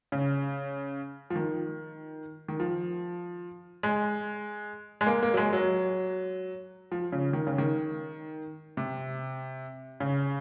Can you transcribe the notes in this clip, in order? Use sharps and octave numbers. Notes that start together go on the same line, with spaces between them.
C#3
F3
D#3
D#3
F3
G#3
G#3
A#3
A#3
F#3
G#3
F#3
F3
C#3
D#3
C#3
D#3
C3
C#3